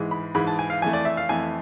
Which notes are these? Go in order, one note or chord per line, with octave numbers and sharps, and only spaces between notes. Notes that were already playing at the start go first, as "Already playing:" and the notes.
Already playing: G#2 E3 G#3
B5
G#2 E3 G#3 B5
A5
G#5
F5
F2 E3 A3 G#5
D5
E5
F5
F2 E3 A3 G#5